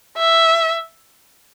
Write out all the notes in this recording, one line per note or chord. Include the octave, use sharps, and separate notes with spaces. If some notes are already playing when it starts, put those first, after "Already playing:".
E5